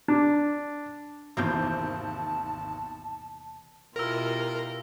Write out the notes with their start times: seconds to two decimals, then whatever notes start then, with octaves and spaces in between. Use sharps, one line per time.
0.08 D4
1.37 G#1 E2 C3 A#3 B3 A5 G6
3.96 B2 E4 F4 G4 A#4 E6 A#6